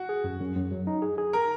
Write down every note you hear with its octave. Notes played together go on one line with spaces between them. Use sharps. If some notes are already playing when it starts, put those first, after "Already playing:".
Already playing: F#4
G#4
F#2
F#2
F#2
F#3
D#4
G#4
G#4
A#4